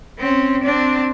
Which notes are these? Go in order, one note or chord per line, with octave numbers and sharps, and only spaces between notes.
C4 C#4
C4 D4